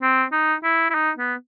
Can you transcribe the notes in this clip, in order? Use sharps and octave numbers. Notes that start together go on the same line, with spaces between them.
C4
D#4
E4
E4
D#4
B3